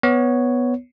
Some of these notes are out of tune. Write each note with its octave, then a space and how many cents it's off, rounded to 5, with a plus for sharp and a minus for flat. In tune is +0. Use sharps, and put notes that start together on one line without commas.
B3 +0 C#5 +0